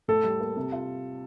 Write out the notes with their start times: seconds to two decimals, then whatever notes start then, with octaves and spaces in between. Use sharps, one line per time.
0.08 A2 A4
0.24 G3
0.40 A#3
0.56 C3
0.72 F4